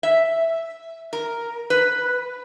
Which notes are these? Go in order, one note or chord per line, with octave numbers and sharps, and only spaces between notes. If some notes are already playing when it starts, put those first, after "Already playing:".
E5
A#4
B4